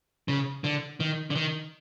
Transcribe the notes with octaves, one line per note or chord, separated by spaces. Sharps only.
C#3
D3
D#3
D3
D#3